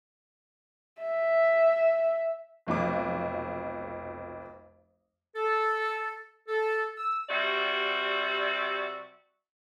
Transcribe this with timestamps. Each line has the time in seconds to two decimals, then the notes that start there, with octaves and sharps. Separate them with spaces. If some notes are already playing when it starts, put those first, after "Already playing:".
1.02 E5
2.67 F1 B1 F2 D6
5.36 A4
6.48 A4
6.98 E6
7.29 C3 G3 F#4 D5 E5